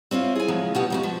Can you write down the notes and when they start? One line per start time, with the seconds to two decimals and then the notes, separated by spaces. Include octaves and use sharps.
0.11 C4 C#4 E4 F4
0.35 G#4 G#5
0.48 C#3 F3 F#3 G#3
0.75 B2 G#3 B3 G4 F#5
0.90 F2 G#2 F#4
1.03 F3